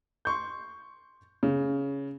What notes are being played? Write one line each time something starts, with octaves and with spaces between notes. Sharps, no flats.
C6 C#6 G6
C#3